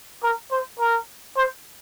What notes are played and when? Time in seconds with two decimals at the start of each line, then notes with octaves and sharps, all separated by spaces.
0.23 A#4
0.51 C5
0.79 A#4
1.37 C5